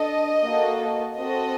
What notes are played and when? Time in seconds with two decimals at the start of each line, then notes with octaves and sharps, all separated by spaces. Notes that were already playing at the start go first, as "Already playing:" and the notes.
Already playing: D4 A4 D#5
0.43 A#3 F#4 A4
1.17 C4 F#4 A4 D#5